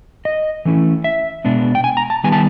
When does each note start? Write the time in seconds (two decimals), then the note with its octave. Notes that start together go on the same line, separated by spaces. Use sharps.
0.25 D#5
0.65 E3 A3 C#4 E4
1.04 E5
1.44 B2 G#3 B3 D4
1.75 G5
1.84 G#5
1.97 A#5
2.10 A5
2.24 D#3 G3 B3 G#5
2.32 A5